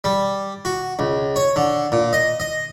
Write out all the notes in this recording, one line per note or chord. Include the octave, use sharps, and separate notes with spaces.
G3
F#4
C#2
C#5
D3
A#2
D#5
D#5